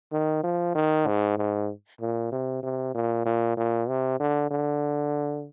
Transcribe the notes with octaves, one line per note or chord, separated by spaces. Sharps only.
D#3
F3
D#3
G#2
G#2
A#2
C3
C3
A#2
A#2
A#2
C3
D3
D3